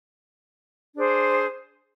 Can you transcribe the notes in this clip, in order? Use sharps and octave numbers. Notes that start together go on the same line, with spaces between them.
D4 G#4 C5